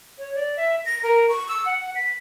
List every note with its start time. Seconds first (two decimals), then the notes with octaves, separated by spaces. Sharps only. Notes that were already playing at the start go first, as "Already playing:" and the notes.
0.18 C#5
0.35 D5
0.57 E5
0.86 A#6
1.03 A#4
1.29 C#6
1.48 E6
1.66 F#5
1.95 B6